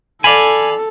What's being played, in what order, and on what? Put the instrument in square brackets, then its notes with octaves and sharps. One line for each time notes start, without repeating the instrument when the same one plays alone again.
[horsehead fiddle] A4 [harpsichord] D5 F5 B5 [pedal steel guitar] G#5